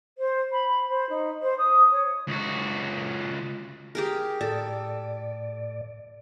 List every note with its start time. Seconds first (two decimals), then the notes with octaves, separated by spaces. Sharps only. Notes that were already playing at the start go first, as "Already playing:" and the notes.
0.18 C5
0.51 B5
0.67 B5
0.88 C5
1.09 D#4
1.42 C5
1.58 D#6
1.91 C#5
2.27 C#2 F#4
3.95 G4 G#4 A#4
4.41 A2 A4 D5